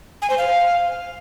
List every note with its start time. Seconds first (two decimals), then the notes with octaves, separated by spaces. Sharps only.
0.22 G#5
0.30 C5
0.38 F5